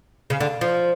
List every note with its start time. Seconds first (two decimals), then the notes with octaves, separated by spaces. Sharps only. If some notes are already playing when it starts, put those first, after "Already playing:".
0.30 C#3
0.40 D3
0.61 F3